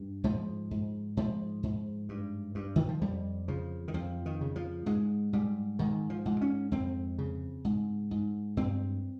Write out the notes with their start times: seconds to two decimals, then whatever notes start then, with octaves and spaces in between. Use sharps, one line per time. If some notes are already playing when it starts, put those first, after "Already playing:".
Already playing: G2
0.24 G#2 F3
0.71 G#2
1.17 G#2 F3
1.63 G#2
2.09 G2
2.55 G2
2.76 D#3
2.88 F3
3.01 F2 G3
3.48 C#3 F3
3.88 D#3
3.94 F2 F3
4.26 D#3
4.41 C#3
4.56 F3
4.86 G#2 G#3
5.33 G#2 G3
5.79 G#2 D#3
6.10 F3
6.25 G#2
6.41 C#4
6.71 F2 C4
7.18 C#3
7.65 G#2
8.11 G#2
8.57 G2 C4